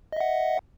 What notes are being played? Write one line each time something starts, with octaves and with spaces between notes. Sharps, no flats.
D#5 E5 F#5